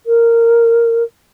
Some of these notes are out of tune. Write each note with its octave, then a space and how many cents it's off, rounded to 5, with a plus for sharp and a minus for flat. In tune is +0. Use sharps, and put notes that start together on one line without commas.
A#4 -10